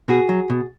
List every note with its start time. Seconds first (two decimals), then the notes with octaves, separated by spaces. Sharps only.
0.08 B2 F#4 G#4
0.29 F#3
0.50 B2